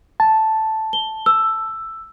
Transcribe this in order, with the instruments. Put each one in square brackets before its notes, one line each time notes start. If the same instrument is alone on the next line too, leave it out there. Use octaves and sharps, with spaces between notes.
[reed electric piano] A5
[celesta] G7
E6